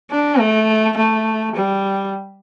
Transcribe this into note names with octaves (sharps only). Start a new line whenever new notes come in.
D4
A3
A3
G3